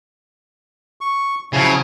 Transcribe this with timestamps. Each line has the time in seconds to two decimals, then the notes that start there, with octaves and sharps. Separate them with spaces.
1.01 C#6
1.53 C#3 F3 F#3 E4